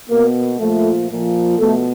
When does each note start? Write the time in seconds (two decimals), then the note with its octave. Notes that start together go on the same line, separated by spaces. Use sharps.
0.09 B2 A#3
0.59 A#2 F3 A3
1.10 A#2 F3
1.59 B2 A3